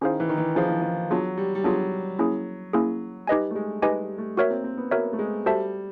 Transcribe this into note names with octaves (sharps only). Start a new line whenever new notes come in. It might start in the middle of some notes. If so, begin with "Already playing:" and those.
D#3 C#4 E4 G#4 C5 F5
E3
D#3
E3
F3 C#4 E4 G#4 C5 F5
E3
F3
F#3 B3 D4 F4 G#4
G3
G3
F#3 B3 D4 F4 G#4
A#3 C#4 E4 G#4
A#3 C#4 E4 G#4
G3 D#4 G4 B4 D#5 G#5
A3
G#3
G3 D#4 G4 B4 D#5 G#5
G3
A3
A#3 F#4 A#4 C#5 E5
C4
C4
B3
A#3 F#4 A#4 C#5 E5
A3
G#3
G3 F#4 A4 C5 E5 A5